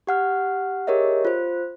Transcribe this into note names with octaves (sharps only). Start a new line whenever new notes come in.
G4 F#5 F6
G4 G#4 A#4 C#5 D#5 E5
F4 C5